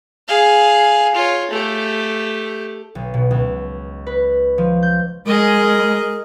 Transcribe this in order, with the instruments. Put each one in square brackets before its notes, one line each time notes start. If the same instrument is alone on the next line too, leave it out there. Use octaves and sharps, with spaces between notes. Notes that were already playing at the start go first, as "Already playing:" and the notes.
[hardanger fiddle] G#4 F5
F4 C#5
A3 G4
[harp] B1
B2
C#2
B4
F3
G6
[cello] G#3 [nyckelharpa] G#4 D#5 [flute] A#4